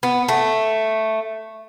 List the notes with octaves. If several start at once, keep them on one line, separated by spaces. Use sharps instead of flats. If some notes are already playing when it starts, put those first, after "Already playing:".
B3
A3